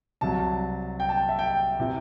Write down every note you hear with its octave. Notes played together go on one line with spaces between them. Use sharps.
C2 C3 F#3 A5
G5
A5
E5
G5
C3 E3